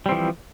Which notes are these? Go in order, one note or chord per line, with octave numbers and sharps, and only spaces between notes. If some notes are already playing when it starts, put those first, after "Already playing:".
E3 F3 G3 C4